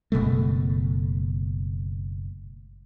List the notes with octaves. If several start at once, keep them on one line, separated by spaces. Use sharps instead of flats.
F#1 B2 G#3 A3